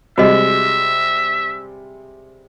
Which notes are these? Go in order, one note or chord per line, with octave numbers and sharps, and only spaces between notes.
C3 G3 G#3 F#4 D#5 E5